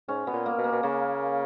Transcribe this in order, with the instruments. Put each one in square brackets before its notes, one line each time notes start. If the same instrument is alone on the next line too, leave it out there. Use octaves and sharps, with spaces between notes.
[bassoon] G#2 [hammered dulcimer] C#4
[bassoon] B2 [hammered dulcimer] B3
[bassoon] A#2
[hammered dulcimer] A#3
[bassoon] B2
[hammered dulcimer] A#3
[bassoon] B2
[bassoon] C#3 [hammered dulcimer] A#3